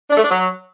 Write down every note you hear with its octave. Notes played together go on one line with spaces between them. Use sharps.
D4
A3
D4
F#3